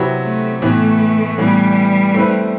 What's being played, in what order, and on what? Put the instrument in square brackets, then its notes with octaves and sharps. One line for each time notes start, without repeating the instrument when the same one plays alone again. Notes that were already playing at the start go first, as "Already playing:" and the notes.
Already playing: [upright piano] C3 F#3 C4 E4 B4
[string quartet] A3
[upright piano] A2 E3 B3 [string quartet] A3
[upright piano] A2 E3 B3 [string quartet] G3
[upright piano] A3 C4 E4 B4